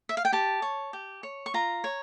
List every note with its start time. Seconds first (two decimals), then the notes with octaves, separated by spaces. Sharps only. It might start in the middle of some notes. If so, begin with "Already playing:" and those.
0.09 E5
0.17 F5
0.25 G5
0.32 G4 A5
0.62 C#5
0.93 G4
1.23 C#5
1.46 C#6
1.54 F4 A#5
1.84 C#5